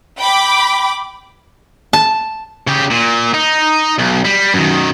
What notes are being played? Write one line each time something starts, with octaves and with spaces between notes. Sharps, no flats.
G5 B5 D6
A5
C#3 G4
A#2
D#4
B1
G3
F#2 D#3